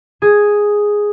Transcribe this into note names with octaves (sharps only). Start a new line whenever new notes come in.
G#4